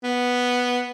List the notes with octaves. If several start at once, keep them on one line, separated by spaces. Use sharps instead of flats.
B3